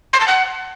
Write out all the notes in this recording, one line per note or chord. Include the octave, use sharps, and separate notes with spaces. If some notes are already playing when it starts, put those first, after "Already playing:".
C6
A5
F#5